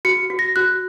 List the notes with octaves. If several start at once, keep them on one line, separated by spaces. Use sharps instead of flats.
F#4 C#7
F#4
A#6
F#4 F#6